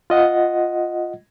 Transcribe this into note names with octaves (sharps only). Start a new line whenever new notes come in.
F4 D#5 F#5